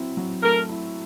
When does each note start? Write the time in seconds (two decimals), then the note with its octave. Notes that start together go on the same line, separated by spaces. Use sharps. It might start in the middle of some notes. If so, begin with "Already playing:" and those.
Already playing: F#3 C4 E4
0.17 F#3
0.43 A3 A#4
0.69 E4